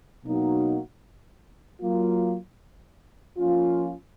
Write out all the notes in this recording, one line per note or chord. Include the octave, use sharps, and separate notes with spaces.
B2 F#3 A#3 D#4 F#4
F#3 A#3 F4
F3 A#3 C#4 F4